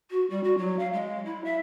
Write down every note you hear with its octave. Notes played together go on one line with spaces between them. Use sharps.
F#4
G3
F#4
F#3
F5
G#3
E4
E5